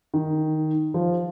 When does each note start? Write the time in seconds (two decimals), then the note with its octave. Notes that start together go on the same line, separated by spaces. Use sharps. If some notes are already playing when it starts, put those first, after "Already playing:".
0.14 D#3
0.94 F3